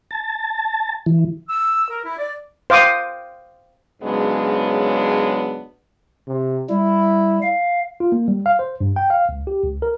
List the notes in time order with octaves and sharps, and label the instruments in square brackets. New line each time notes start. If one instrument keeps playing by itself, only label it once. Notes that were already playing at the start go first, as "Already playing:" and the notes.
[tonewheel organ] A5
E3
[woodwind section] E6
A#4
E4
D5
[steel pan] C5 F5 D6 D#6
[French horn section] G#2 C#3 F#3 G#3 B3 D4
[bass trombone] C3
[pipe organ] G3 [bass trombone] E4
[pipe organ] F5
[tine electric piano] F4
A#3
G3
F5
C5
G2
G5
F5
C#2
G4
C#2
A#4